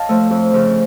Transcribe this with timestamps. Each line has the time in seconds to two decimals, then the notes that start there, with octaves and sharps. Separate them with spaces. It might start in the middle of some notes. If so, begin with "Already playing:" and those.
Already playing: C#5 D#5 F5 A5
0.09 F3 A3
0.30 F2
0.53 C#3 F3